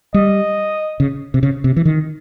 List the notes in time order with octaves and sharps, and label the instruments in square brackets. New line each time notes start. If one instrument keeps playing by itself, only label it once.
[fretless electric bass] G3 [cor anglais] D#5
[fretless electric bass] C#3
C3
C#3
C3
E3
D#3